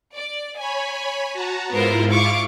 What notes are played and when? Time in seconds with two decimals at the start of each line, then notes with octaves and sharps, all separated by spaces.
0.15 D5
0.58 C#5 G#5 B5
1.33 F#4 A5 A#5
1.71 G#2 B3 E4 F4 A#4 C5
2.11 F5 C#6 D6